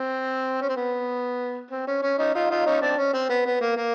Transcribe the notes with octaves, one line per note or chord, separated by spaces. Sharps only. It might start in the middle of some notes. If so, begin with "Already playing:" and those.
Already playing: C4
C#4
C4
B3
C4
C#4
C#4
C#4 D#4
D#4 F4
D#4 F4
C#4 D#4
C4 D4
C#4
C4
B3
B3
A#3
A#3